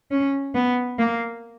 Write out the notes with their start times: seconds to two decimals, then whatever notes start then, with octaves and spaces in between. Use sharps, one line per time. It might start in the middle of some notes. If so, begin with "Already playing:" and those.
0.11 C#4
0.55 B3
0.98 A#3